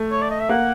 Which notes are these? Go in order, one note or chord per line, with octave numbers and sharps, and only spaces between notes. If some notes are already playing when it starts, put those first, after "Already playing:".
Already playing: A3
C#5
D5
D#5
E5
A#3 F#5